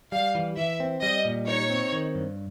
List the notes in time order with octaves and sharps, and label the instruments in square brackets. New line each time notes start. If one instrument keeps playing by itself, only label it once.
[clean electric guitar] G3 [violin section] F5
[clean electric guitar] E3
[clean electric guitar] E3 [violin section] E5
[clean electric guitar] C4
[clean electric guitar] G3 [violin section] D#5
[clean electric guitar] A#2
[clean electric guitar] D#4 [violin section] C#5
[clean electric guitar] C4
D#3
G2